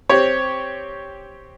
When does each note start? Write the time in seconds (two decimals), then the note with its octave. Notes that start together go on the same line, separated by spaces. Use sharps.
0.09 C4 G4 C#5